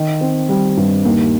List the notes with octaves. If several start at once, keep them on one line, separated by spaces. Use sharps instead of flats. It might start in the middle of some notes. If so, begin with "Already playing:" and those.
Already playing: D#3
C4
G3
G2
D#2